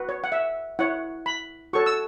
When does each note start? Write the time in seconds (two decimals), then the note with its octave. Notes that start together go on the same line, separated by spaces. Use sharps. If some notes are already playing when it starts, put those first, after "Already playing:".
Already playing: F#4 B4
0.09 C#5
0.24 F#5
0.32 E5
0.79 E4 C#5 F#5
1.26 B5
1.73 F#4 A4 C#5 C#6
1.86 E6